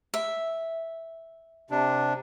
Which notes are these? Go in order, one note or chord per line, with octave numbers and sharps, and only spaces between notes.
E5
C3 D4